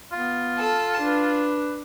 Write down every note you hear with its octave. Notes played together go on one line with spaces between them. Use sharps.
B3 F4
A4 A5
D4 B4